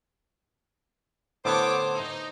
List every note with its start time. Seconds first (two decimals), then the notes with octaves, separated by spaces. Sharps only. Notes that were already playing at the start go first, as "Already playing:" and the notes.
1.45 A2 D3 B3 A4 C5 C#5 D6
1.94 D#4